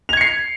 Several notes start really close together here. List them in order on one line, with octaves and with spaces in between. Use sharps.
F7 G#6 C#7 C7